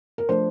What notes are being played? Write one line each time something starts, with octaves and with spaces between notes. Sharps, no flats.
A#4
F3 A3 D4 C5